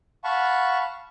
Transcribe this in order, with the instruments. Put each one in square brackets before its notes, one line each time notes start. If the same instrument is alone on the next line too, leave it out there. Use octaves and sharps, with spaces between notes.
[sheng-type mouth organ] F5 F#5 A5 B5 C#6